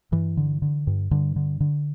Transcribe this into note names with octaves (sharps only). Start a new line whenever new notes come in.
G2 E3
D3
D3
G2
G2 D3
D3
D3